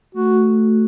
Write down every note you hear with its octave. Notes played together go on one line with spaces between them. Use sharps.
A3 F#4